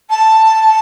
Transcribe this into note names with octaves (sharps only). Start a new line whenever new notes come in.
A5